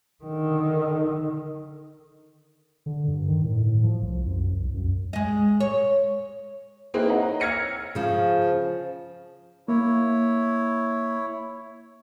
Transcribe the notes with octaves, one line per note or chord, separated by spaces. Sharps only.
D3 D#3
D3
G2
D#3
A2
A2
F3
C2
F#2
C2
F#2
G#3 D#5
C#5
A#3 C4 D#4 E4 G#4 B4
C#5 D#5 F#5 A#5
E6 F6 G#6 A#6 C#7 D#7
C#3 F3 C#4
A#3 E4 C#5